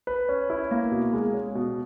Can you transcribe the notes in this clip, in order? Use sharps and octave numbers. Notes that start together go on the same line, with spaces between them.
B4
C#4
E4
A#3
B2
G#3
C#4
B2